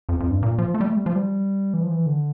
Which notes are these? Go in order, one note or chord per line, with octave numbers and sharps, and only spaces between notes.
F2
F2
G2
A#2
F3
A3
G3
A3
G3
F3
G3
E3
F3
E3
D3